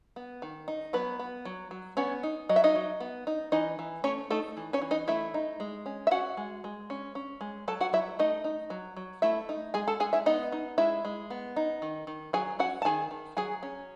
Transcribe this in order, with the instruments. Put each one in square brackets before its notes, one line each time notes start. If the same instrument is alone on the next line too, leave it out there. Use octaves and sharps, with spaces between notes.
[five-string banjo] B3
D#3
D#4
F#3 B3 B4
B3
F#3
F#3
B3 C#4 C#5
D#4
F#3 D#5
E5
D#4 D#5
F#3
B3
D#4
E3 D#4 D#5
E3
A3 C#4 C#5
A3 D#4 A4
E3
C#4 C#5
E3
D#4 D#5
A3 E4 E5
D#4
G#3
C#4
E5
C#4 F#4 F#5
G#3
G#3
C#4
C#4
G#3
F#3 A4 A5
F#4 F#5
F#3 E4 E5
A3 D#4 D#5
D#4
F#3
F#3
A3 E4 E5
D#4
G#3 G#4 G#5
A4 A5
G#3 G#4 G#5
E4 E5
B3 D#4 D#5
D#4
G#3 E4 E5
G#3
B3
D#4
D#3
D#3
F#3 G#4 G#5
C#4 F#4 F#5
A5
D#3 G#4 G#5
D#3
F#3 G#4 G#5
C#4